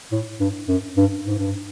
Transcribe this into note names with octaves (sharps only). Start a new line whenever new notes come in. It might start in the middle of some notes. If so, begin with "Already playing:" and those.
A2
G2
F#2
G2
G#2
G2